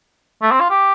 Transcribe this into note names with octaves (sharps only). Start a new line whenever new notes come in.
A3
C4
F4
G4